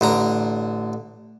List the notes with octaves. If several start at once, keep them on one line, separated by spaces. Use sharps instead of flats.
A1 D3 A#5